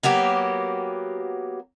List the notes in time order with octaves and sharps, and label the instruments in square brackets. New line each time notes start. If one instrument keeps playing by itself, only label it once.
[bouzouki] F#3 A#3 B3 G4